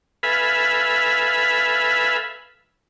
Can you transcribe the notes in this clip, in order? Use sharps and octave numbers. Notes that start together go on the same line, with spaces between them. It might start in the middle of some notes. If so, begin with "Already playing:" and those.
A4 B4 E5 F5 G#5 B5